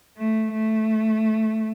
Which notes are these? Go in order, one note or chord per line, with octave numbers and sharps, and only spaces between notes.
A3
A3